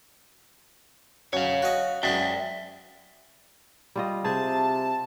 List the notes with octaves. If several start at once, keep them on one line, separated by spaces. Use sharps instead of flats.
F#2 C#5 F5
F#4 D#5
F#2 G#3 D5 E5 G5
G3 F4 D#5
C3 G#4 C5 A5